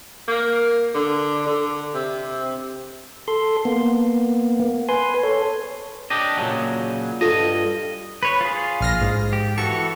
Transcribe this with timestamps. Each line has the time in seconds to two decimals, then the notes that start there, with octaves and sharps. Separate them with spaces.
0.28 A#3
0.94 D3
1.47 D3
1.94 C3
3.28 A4 C6
3.65 A#3 B3
4.89 B4 G#5 C6
5.23 A4 C#5
6.10 D4 G4 D#5
6.37 A#2 C#3 F#3
7.21 G2 F4 A4 D#5
8.23 B4 C#5
8.41 F4 G#4
8.80 A#1 F6 A#6
9.01 G#2
9.33 G4
9.58 E3 F#4 A4 C#6